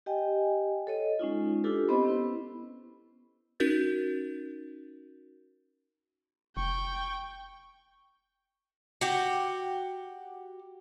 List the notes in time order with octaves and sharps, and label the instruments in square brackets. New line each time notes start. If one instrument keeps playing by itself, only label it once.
[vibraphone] G4 D#5 G5 G#5
A4 C#5 D#5
G#3 C#4 D#4 F4
D4 E4 F4 G4 A4 B4
B3 C4 G4 C5 D#5 B5
B3 C#4 E4 B4
[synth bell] C#4 D#4 F#4 A#4 G6 A6
[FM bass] F1 [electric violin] G5 [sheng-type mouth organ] C#6
[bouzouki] F#4 G4